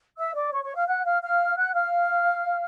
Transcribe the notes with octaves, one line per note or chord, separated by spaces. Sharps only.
E5 E6
D5 D6
C#5 C#6
C#5 C#6
F5 F6
F#5 F#6
F5 F6
F5 F6
F#5 F#6
F5 F6